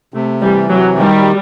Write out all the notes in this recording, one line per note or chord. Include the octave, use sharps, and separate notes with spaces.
C3 A3
E3 G3
C3 F#3
D#3 G3